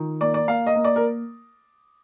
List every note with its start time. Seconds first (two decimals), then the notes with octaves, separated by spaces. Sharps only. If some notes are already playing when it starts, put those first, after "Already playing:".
Already playing: D#3 F4
0.21 A#3 D5
0.34 D5
0.48 A#3 F5
0.67 D#5
0.75 A#3
0.84 D5
0.96 A#4